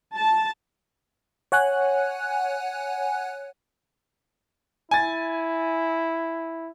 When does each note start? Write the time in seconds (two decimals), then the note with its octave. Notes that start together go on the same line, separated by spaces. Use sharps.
0.15 A5
1.52 C#5 F#5 G#5 F#6
4.91 E4 G#5 A6